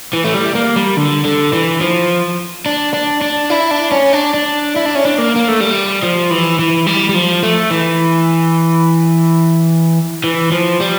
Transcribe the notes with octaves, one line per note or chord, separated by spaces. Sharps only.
E3
A3
G3
A#3
G3
D3
D3
E3
F3
D4
D4
D4
E4
D4
C#4
D4
D4
E4
D4
C#4
D4
A#3
A#3
A3
G3
F3
E3
E3
G3
G3
F3
A3
E3
E3
F3
G3